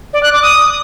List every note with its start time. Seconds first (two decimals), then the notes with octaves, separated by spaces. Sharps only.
0.13 D5
0.23 F#6
0.33 D6
0.42 D#6